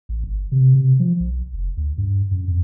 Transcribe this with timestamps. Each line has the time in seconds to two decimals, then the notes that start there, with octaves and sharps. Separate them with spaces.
0.09 A1
0.24 G1
0.52 C3
0.75 C3
1.00 F3
1.20 B1
1.53 F1
1.77 D2
1.98 G2
2.31 F#2
2.48 F2